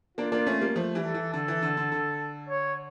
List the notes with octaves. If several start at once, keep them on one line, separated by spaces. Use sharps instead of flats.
A#3 D4 F4
A#3 D4
A3 C#4
G3 A#3
F3 A3
E3 G3
A4
E3
D3 A4
E3
D3
D3
D3
C#5